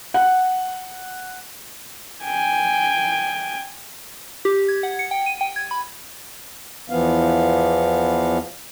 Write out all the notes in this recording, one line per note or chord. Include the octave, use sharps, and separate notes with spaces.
F#5
G5 G#5
G4
G#6
F#5
C#7
G5
D#7
G5
G#6
B5
E2 E3 F3 B3 F5